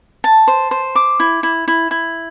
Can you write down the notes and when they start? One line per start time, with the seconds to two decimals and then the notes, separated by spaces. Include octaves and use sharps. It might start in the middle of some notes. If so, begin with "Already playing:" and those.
0.24 A5
0.48 C5
0.71 C5
0.95 D6
1.20 E4
1.43 E4
1.68 E4
1.91 E4